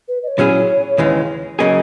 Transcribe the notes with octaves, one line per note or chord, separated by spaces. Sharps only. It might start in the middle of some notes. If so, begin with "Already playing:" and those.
B4
D#5
C#5
A#2 F#3 C#4 E4 G#4
D#2 C#3 E3 G#3
C#3 F#3 A#3 C#4 G#4 D#5